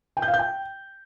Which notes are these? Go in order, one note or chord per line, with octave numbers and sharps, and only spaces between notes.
G5
G6
F5
G6
G5